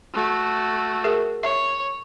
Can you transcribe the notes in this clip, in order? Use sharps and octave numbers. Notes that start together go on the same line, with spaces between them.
A3 F#4
G#4 A#4 E5
C#5 E5